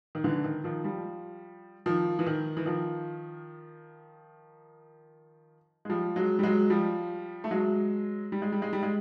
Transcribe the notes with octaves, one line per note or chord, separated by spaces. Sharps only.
D#3
D3 E3
E3
D#3
D#3 F3
F3 G3
D#3 F3
E3
D#3
E3
D#3 F3
G#3
F3 G3
F#3 G#3
G3
F#3 G#3
F3 G3
A3
F#3 G#3
G3
G#3
G3
G#3
G3
G#3